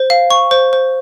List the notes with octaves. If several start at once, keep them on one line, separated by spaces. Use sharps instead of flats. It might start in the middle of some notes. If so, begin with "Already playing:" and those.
Already playing: C5
F5
C#6
C5
C5